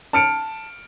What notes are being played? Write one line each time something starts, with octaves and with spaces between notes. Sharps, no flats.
A5 F6 C#7 D7